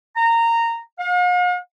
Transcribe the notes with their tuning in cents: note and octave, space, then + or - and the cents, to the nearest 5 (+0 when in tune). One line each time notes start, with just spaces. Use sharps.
A#5 -15
F5 +45